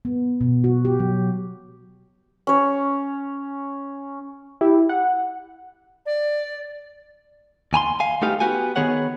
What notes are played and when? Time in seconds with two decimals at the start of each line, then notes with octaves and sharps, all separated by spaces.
0.05 B3
0.41 B2
0.64 F#4
0.85 G4
1.00 F#3
2.47 C#4 C#5
4.61 E4 G4
4.89 F#5
6.06 D5
7.73 D#2 G#5 A#5 C6
8.00 F5 G#5
8.22 A3 B3 D#4 G4 F5
8.40 B3 F#4 G4 G#5
8.76 D#3 B3 G#4 C#5 F#5